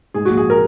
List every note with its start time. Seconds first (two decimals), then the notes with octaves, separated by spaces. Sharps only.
0.14 G#2 G#4
0.25 F#4
0.29 A#1
0.37 G#4
0.50 A#4